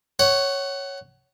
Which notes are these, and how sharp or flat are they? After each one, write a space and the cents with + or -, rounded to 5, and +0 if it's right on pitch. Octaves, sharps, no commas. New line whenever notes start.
C#5 +0 F#5 +25